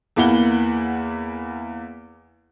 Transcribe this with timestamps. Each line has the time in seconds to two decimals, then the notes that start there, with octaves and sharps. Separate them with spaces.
0.16 E2 A#3 E4 F#5 G7